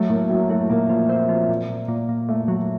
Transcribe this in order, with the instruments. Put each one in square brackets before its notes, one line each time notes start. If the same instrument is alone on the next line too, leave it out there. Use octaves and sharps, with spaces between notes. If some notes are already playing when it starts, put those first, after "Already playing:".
Already playing: [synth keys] F#3 [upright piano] A3
[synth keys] A2 [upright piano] A#3
[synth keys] A2 [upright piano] F#3
[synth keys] F#3 [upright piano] A3
[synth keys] A#2 [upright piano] A#3
[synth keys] F3
C4
F3
A#2
A#2
A#2
A#2
[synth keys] A#2 [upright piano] A3
[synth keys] F#3